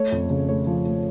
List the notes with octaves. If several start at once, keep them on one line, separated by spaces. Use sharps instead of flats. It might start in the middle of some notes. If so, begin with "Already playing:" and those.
Already playing: A3 C#5
F2
C#3
A3 C#5
F3
A3